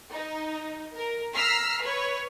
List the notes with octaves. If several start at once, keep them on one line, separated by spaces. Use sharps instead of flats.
D#4
A#4
A#5 E6 F6 B6 C7
B4 C#5